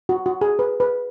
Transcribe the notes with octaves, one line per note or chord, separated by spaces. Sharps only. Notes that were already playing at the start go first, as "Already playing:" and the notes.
F#4
F#4
G#4
B4
B4